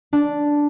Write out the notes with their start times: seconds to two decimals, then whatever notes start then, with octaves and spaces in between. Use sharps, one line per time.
0.13 D4